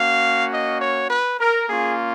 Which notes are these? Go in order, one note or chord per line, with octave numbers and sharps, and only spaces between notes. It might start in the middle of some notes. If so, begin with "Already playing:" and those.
Already playing: A#3 C#4 F#4 F5
D#5
C#5
B4
A#4
A#3 C#4 F4 G#4